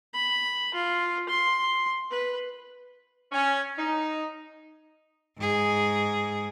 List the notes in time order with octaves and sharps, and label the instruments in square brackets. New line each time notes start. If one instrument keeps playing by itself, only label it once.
[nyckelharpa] B5
F4
C6
B4
[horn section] C#4
D#4
[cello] G#2 G#4